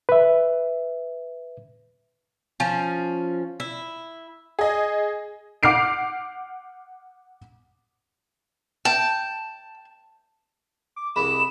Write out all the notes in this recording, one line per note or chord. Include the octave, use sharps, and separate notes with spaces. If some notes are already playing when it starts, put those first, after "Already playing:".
B4 E5
F3 C#4
E4
G#4 D#5
F#5 D6 F6 G6 C7 D7
G5 A5
D6
C2 G#3 B5 E7